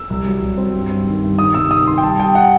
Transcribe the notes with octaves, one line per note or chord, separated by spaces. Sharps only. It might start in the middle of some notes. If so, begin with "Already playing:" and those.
Already playing: E6
C2
F#3
C2
C4
G2
G2
D#3
G2
D#3 D#6
C3 E6
D#3 D#6
D#3 C6
G5
G3 A5
G3 G5
F#5